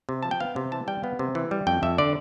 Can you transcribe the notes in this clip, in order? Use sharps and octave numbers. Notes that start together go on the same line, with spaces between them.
C3
F3 A5
G5
B3 F5
C3
E3 A5
G3 G5
B3 F5
C3
E3
G3
F2 G5
F2 E5
D3 D5